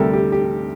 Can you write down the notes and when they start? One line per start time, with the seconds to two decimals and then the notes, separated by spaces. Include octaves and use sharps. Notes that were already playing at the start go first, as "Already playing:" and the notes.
Already playing: D2 C3 G3 G4 A4 A#4
0.13 G4
0.32 G4